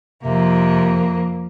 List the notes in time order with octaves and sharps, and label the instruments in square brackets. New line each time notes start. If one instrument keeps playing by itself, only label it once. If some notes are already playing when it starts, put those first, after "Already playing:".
[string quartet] F2 A#3 [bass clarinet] C3